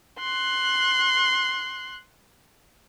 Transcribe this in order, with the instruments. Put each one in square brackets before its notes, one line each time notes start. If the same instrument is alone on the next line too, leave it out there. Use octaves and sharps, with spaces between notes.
[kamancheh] C6 F#6